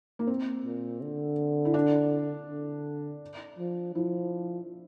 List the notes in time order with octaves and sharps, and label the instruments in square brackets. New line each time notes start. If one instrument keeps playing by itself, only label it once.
[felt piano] A#3
C4
[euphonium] A#2
D3
[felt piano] E4
D4
[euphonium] D3
F3
[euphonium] F3 [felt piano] E4